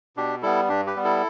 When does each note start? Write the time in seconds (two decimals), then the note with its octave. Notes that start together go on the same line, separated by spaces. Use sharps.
0.17 B2 D4 G4
0.43 G3 B3 E4 A4
0.69 G2 D4 G4
0.87 G4 B4
0.96 G3 B3
1.04 E4 A4